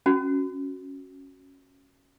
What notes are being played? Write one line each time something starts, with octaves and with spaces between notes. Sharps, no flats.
C#4 F#4